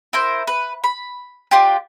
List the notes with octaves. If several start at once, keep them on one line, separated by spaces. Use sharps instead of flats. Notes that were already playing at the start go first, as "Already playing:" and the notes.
E4 A#4 C5
B4
B5
D4 F4 G4